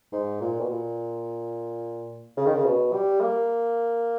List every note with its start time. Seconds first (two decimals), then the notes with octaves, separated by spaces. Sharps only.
0.12 G#2
0.41 A#2
0.60 B2
0.69 A#2
2.37 C#3
2.46 D#3
2.55 C#3
2.65 B2
2.93 G3
3.21 A#3